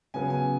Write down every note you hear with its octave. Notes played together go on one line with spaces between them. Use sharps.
C#3 F#3 B3 G#5
G#5